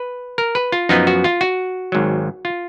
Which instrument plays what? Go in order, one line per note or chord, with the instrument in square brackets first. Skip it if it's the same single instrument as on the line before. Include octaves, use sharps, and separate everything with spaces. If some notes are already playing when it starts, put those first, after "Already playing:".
Already playing: [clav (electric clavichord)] B4
A#4
B4
F4
F#2 F3 B3 D#4
F#4
F4
F#4
G#1 G#2 F#3
F4